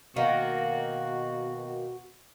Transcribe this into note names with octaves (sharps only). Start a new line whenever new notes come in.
B2 D#3 A#3 F#4